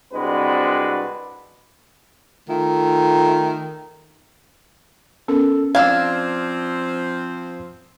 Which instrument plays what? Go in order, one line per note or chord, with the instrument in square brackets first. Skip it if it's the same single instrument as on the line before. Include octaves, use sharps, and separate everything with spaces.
[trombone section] C2 G#3 C4 D4 F#4 B4
[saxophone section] D#3 A3 F4
[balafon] B3 C#4 A#4 [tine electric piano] A4
[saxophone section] F3 C4 [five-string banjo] D4 F5 [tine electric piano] E6 F6 G#6